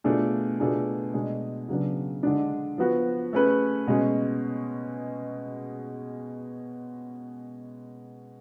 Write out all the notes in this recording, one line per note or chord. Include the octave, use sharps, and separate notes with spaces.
B2 A3 D4 F4 G#4
B2 A3 D4 F4 G#4
B2 G#3 D4
C#3 F#3 B3 D4
D3 G#3 D4
F3 B3 F#4 B4
A3 C#4 G#4 B4
B2 G#3 C#4